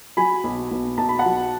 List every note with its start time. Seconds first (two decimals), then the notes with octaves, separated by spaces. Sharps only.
0.17 F#3 G#5 B5
0.44 B1
0.72 B1
0.98 B1 A5
1.09 B5
1.19 F#5 A5
1.26 F#3